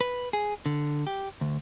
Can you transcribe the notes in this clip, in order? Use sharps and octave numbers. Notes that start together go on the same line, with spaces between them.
B4
G#4
D3
G4
D2